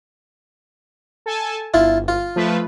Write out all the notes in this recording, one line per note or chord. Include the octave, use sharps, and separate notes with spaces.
A4 G#5 A5
G1 E4 F4 A5
F4
F3 A3 B4